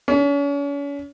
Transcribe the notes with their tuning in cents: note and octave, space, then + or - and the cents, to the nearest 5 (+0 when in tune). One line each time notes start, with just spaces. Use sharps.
C#4 +40